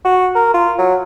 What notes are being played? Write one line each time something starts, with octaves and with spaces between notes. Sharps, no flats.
F#4
A#4
F4
F#3